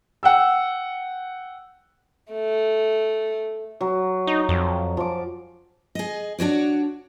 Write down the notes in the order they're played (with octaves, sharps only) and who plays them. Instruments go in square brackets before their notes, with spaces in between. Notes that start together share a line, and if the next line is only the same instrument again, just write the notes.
[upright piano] F#5 G5 E6
[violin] A3
[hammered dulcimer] F#3
[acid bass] D#4
F2
[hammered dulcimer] F3 D6
[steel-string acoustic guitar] G#4 D#5
D4 F#4 C#5 D5